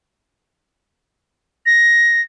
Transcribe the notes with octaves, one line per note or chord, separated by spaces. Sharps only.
A#6